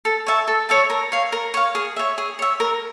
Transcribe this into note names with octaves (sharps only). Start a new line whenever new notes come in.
A4
C#5 E5 A5
A4
C#5 E5 A5
A#4
C#5 F5
A#4
C#5 F5
G#4
C#5 E5
G#4
C#5 E5
A#4